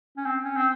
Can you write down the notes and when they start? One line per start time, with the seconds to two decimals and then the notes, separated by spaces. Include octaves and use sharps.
0.17 C#4
0.26 C4
0.44 C#4
0.56 C4